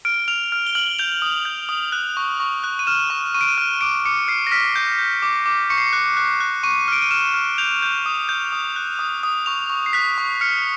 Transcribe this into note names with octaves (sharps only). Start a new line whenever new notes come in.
F6 D7
F6 F7
F6
G7
F6 F#7
G6 F7
D#6
G6
D#6
F#6
C#6
C#6
F#6
D#7
F6 E7
C#6
C#6 D#7
D7
D#7
F6
D6 D7
D6 C#7
F6 C7
A#6
F6 B6
G6
G6
D6
D6
C#6 C#7
C7
C#7
F#6
F#6
F#6
C#6 D#7
F6 D7
D#7
F6 E7
F6
G6 F7
G6
D#6
G6
D#6
F#6
D#6
D#6
C#6 F7
C#6
C7
F#6 B6
C#6
F6 C#7